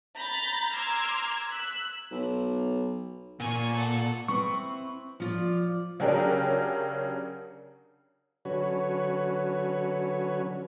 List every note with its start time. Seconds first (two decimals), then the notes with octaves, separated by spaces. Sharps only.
0.17 A#5 B5 G6 A6
0.73 A#5 C6 D6 E6 F6 G#6
1.49 E6 F#6 B6
2.11 B1
3.40 A#2 G#5 C#6
3.75 A4 F#5
4.28 C4 E4 B4 C#6
5.20 F3 F4 D5
6.00 C#3 F#3 C#4 D4 G4 A#4
8.45 D3 F#3 C#4 F#4 B4 C#5